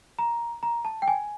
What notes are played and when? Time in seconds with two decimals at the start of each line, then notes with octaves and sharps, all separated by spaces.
0.19 A#5
0.63 A#5
0.85 A5
1.02 G5
1.08 G#5